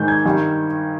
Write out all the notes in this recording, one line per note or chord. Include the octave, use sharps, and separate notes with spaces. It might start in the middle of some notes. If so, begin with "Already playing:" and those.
Already playing: G#2 D#3 G#3 G6
G#6
G2 D#3 G3